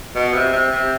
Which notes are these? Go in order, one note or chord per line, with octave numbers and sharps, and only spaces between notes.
B2
C3
C3
C3